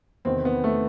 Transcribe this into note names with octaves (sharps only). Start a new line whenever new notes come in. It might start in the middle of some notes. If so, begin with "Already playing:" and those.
E2 C3 D#3 C4
B3
A3